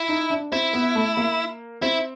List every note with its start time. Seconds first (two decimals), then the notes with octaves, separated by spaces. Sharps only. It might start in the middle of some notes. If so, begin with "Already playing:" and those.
Already playing: E4
0.08 D#4
0.30 D4
0.52 C4 E4
0.73 B3
0.95 A3
1.17 A#3
1.82 C4 E4